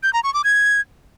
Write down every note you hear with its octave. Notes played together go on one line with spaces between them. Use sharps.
G6
A#5
C#6
D6
G#6